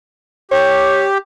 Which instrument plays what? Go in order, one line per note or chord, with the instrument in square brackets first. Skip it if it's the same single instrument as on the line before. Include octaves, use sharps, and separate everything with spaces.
[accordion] G4 [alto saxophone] C#5